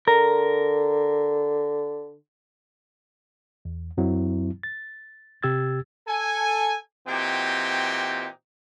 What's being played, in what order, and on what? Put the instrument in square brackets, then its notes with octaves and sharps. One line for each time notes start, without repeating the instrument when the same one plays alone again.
[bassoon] D3 [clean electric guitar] A#4
[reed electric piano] E2
F#2 F#3 C4 E4
A6
C3 G4 E6 G#6 A6
[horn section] A4 G#5
A#2 E3 C4 D#4 F#4 G4